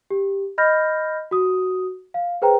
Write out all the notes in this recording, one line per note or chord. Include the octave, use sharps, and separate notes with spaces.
G4
D#5 B5 F6 G6 A#6
F#4 D#6
F5
G#4 B4 C5 G5 A#5